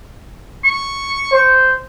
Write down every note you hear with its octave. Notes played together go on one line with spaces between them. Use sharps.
C#6
C5